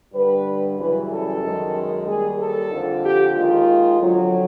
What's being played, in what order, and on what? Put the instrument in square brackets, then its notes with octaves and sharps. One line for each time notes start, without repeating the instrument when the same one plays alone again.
[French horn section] G2 D3 G3 B4
F#2 C#3 E3 G3 B4
A4
F#2 D#3 G#3
D#2 D#3 G3 G#4
A4
F2 D3 F3
G4
D#2 D#3 G#3 F4
F2 D3 F#3